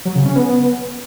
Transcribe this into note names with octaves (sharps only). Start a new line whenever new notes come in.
F#3
C#3
C#4
B3
B3